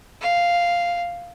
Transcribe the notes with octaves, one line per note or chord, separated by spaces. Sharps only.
F5